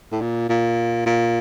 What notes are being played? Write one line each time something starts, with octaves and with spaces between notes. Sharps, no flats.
A2
A#2
A#2
A#2